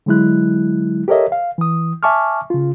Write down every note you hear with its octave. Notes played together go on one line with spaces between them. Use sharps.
D3 F#3 G#3 E4 F#6
G4 A4 A#4 C#5 D#5 E5
F5
E3 D#6
E5 G#5 A5 C#6 D6 F6
C#3 F4